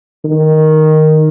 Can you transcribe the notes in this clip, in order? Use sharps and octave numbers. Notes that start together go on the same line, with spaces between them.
D#3